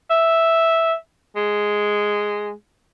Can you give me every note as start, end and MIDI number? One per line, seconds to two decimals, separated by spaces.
0.10 0.94 76
1.36 2.52 56